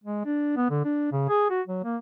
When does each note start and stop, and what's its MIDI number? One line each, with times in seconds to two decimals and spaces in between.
0.04 0.24 56
0.25 0.52 62
0.56 0.70 59
0.70 0.82 50
0.85 1.09 62
1.12 1.26 49
1.29 1.49 68
1.50 1.61 66
1.68 1.82 54
1.84 1.97 58